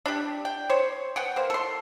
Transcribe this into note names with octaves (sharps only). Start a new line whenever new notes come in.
D4 G4
G5
C5 C#5
B3 F#5 G5
A#3 C5
A4 C6